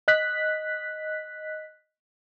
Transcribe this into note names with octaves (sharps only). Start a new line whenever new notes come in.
D#5 F#6 B6